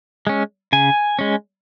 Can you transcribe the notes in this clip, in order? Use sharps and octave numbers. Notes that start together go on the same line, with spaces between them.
G#3 C#4
C#3 G#5
G#3 C#4